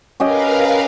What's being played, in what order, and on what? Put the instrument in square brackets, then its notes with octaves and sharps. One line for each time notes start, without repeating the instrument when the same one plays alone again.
[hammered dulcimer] C#4 G4 D#5 [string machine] A#4 B4 F5